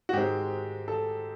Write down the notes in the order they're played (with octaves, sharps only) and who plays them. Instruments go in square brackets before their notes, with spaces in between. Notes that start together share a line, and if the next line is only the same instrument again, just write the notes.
[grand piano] F#4
G#2 D#3 G#3 C4 G4
A4